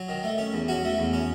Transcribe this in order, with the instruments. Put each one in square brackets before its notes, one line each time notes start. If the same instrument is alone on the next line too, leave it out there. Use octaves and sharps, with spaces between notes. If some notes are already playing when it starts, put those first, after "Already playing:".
Already playing: [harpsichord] F#3
D#3
A3
C#4
E2
C#4 F#4
A3
E2
C#4